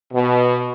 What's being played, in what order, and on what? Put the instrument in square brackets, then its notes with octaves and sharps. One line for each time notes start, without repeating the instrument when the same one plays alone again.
[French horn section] B2